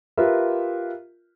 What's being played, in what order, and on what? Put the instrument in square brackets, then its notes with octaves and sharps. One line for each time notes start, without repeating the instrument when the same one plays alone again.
[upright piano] F4 G4 A#4 B4 E5